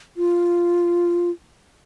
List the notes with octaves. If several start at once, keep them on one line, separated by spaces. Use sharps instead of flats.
F4